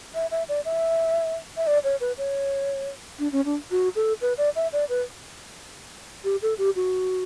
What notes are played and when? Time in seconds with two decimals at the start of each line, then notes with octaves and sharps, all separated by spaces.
0.15 E5
0.31 E5
0.49 D5
0.65 E5
1.57 E5
1.67 D5
1.84 C#5
2.01 B4
2.18 C#5
3.19 D4
3.32 C#4
3.45 D4
3.71 F#4
3.96 A4
4.22 B4
4.38 D5
4.56 E5
4.73 D5
4.89 B4
6.24 G4
6.42 A4
6.58 G4
6.76 F#4